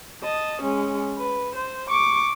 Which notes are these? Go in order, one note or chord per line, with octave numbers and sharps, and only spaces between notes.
D#5 A5
G#3 C#4
B4
C5
C#6 D6